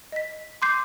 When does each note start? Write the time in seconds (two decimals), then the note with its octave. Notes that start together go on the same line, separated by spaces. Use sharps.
0.12 D#5 B6
0.62 C6 D6 G6 C7